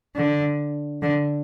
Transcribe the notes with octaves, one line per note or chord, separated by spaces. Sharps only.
D3
D3